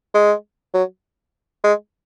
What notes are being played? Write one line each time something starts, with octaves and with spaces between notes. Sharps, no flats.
G#3
F#3
G#3